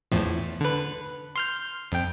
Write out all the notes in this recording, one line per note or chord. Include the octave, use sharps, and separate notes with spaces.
E2 A2 F3
D3 B4
C6 F6 G6
F2 G5